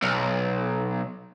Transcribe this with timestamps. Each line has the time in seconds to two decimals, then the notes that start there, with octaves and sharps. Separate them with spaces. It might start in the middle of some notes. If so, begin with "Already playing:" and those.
0.02 B1